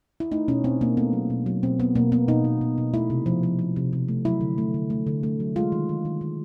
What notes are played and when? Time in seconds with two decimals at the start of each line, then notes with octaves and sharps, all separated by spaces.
0.20 E4
0.31 A3 D#4
0.48 B2 C#4
0.64 B2 C4
0.81 B2 A#3
0.97 A3 B3
1.13 F#3
1.30 B2
1.46 F#3
1.63 B2 C4
1.79 A#3 B3
1.95 B2 A#3
2.12 A#3 B3
2.28 B2 D#4
2.45 B2
2.61 B2
2.78 B2
2.94 A3 E4
3.10 C3
3.26 F3
3.43 F3
3.59 F3
3.76 C3
3.93 C3
4.08 A3
4.25 F#3 E4
4.41 D3
4.58 A3
4.74 D3
4.90 A3
5.07 D3
5.23 A3
5.40 F#3
5.56 G#3 F4
5.72 D#3
5.89 D#3
6.05 D#3
6.21 D#3